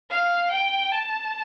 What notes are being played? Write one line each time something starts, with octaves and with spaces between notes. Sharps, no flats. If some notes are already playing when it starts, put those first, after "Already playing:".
F5
G5
A5